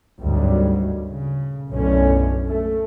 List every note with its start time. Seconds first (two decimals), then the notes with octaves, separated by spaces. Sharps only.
0.20 G#1 D2 G2 D#3 F#3 G3
1.08 C#3
1.69 B1 F#2 A2 D3 A3 C#4
2.47 A3